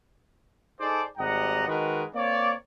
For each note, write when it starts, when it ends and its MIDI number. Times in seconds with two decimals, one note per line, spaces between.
0.79 1.03 63
0.79 1.03 68
0.79 1.03 69
0.79 1.03 72
0.79 1.03 74
1.18 1.64 32
1.18 1.64 44
1.18 1.64 55
1.18 1.64 75
1.18 1.64 78
1.18 1.64 82
1.67 2.03 51
1.67 2.03 56
1.67 2.03 66
1.67 2.03 68
1.67 2.03 70
1.67 2.03 71
2.14 2.53 58
2.14 2.53 60
2.14 2.53 73
2.14 2.53 74